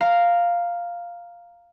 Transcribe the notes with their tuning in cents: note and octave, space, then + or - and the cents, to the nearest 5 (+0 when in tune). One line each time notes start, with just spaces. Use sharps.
F5 +0 A#5 -10